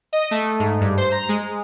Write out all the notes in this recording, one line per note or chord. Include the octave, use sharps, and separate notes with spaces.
D#5
A3
G#2
G2
C5
A#5
G#3